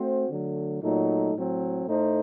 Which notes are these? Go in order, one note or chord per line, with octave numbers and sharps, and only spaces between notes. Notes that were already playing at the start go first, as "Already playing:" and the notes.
Already playing: A3 C4 F#4 C5
D3 F#3 A3
A#2 F#3 A3 D#4
A2 F#3 C4
A2 A3 D#4 A4 C5